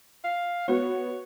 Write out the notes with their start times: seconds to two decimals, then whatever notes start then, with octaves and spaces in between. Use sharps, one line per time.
0.24 F5
0.68 B3 F#4 C#5